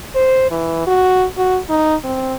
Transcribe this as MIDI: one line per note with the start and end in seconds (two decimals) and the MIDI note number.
0.15 0.47 72
0.51 0.82 52
0.87 1.25 66
1.37 1.59 66
1.69 1.95 63
2.04 2.36 60